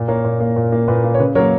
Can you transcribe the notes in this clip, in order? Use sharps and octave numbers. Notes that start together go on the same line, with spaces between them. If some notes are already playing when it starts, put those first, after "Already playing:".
Already playing: A#2
A#3 A#4 C#5
A#2
A#3
A#2
A#3
A#2 B4
A#3
C#5
C#3 B4
F#3 A#3 A#4 C#5